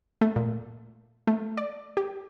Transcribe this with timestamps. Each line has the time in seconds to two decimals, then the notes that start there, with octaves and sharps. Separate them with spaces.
0.21 A3
0.36 A#2
1.27 A3
1.57 D5
1.97 G4